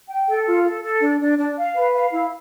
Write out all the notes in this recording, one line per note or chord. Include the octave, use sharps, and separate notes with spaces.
G5
A4
F4
A4
A4
D4
D4
D4
F5
B4
F5
E4